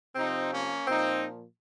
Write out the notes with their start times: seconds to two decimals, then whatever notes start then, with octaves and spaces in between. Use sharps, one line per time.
0.15 C3 F3 C4 D#4
0.51 A#3 C#4
0.87 A#2 F3 C4 D#4